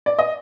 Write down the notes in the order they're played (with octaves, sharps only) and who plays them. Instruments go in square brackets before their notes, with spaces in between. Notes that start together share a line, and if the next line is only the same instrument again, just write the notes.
[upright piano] D5
D#5